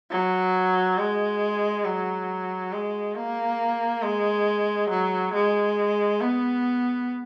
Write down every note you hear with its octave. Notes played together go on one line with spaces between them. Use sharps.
F#3
G#3
F#3
G#3
A#3
G#3
F#3
G#3
B3